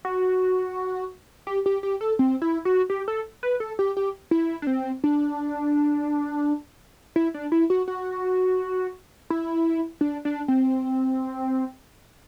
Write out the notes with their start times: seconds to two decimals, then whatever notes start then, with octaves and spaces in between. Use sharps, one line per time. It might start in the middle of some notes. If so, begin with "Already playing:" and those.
0.05 F#4
1.47 G4
1.66 G4
1.83 G4
2.01 A4
2.19 C4
2.42 E4
2.65 F#4
2.90 G4
3.08 A4
3.43 B4
3.60 A4
3.79 G4
3.97 G4
4.31 E4
4.62 D4
4.67 C4
5.04 D4
7.16 E4
7.34 D4
7.52 E4
7.70 F#4
7.88 F#4
9.30 E4
10.01 D4
10.25 D4
10.48 C4